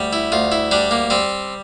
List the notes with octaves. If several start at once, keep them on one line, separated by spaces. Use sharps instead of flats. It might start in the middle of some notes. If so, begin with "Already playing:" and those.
Already playing: D2 G3
E4
D2 F4
E4
G3 D4
A#3
G3 C4